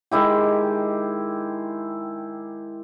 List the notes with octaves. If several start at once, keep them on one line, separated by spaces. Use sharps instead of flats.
D#3 G#3 E4 G4